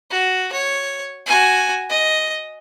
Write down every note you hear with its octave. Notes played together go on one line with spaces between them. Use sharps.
F#4
C#5
F#4 G#5
D#5